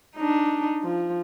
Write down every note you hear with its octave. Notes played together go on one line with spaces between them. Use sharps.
D4 D#4
F3